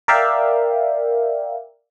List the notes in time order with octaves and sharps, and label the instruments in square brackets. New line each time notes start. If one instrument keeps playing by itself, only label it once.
[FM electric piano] A#4 D5 E5 F5 G5